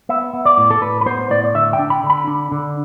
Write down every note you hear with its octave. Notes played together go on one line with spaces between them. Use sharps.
B3 E5
B3
D5
A2
A4
A2 B4
B4
B3 C5
A2 D5
D5
D3 E5
G5
D4
B5
D3
B5
D4
D3